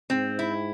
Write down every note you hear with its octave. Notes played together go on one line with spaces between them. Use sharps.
G#2 C4
E4